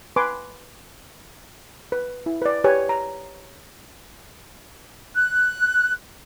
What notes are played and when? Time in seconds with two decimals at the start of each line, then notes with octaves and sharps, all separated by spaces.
0.16 B4 G#5 C6 D6
1.92 B4
2.26 E4
2.42 B4 D5
2.64 G4 B4 C#5 G#5
2.89 A#5
5.15 F#6